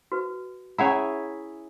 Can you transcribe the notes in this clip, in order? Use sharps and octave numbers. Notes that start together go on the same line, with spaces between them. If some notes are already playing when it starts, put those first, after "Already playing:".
F#4 B4
C#4 E4 G#4 C#5 F#5 A#5